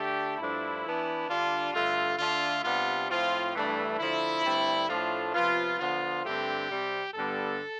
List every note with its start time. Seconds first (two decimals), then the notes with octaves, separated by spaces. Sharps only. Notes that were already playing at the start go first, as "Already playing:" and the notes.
Already playing: D3 A3 D4 G4
0.38 G2 F3 A3 D4 E4
0.83 E3 B3 D4
1.28 D3 G3 D4 F4
1.73 G2 D3 A3 F4
2.18 D3 A3 D4 F4
2.63 C3 G3 B3 D4 F4
3.08 A2 F3 C4 F4
3.54 G2 E3 A3 D4
3.98 D3 F3 A3 E4
4.44 G2 D3 A3 C4
4.89 A2 F3 A3 D4 F4
5.34 C3 F3 B3 F4
5.79 D3 F3 B3 F4
6.24 G2 D3 A3 C4 G4
6.69 C3 G3 C4
7.14 G2 D3 G3 B3 A4